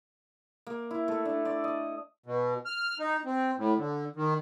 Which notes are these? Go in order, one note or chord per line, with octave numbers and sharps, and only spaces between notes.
A#3
E4
A3
D4
D5
D#5
B2
F6
D#4
C4
A2
D3
D#3